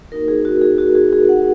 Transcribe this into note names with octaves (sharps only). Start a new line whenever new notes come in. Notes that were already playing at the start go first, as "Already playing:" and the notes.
A#3 D#4 F#4 A#4
G#4
F#4
G#4
F#4
G#4
G#4
F#5